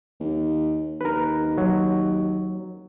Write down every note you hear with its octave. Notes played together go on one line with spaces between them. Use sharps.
D#2
D#2 A#4 B4
F#3